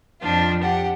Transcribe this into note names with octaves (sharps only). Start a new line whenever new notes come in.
F2 F3 D4 F4
G4 F#5